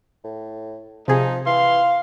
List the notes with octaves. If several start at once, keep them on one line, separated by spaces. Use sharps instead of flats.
A2
C3 F3 D#4 G#4
E3 F5 C6